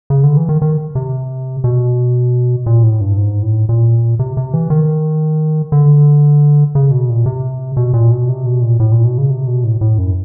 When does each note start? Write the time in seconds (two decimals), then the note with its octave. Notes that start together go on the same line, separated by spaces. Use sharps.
0.10 C#3
0.24 D3
0.37 E3
0.49 D#3
0.62 D#3
0.95 C3
1.64 B2
2.66 A#2
2.83 A2
3.01 G2
3.17 G#2
3.42 A2
3.69 A#2
4.19 C3
4.37 C3
4.54 E3
4.70 D#3
5.72 D3
6.75 C#3
6.91 B2
7.09 A#2
7.26 C3
7.77 B2
7.94 A#2
8.11 B2
8.28 C3
8.46 B2
8.62 A#2
8.80 A2
8.92 A#2
9.05 B2
9.18 C#3
9.30 C3
9.47 B2
9.64 A2
9.81 A2
9.98 F#2